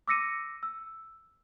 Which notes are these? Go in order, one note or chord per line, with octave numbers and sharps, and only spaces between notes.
D6 E6 A#6 C#7 D#7
E6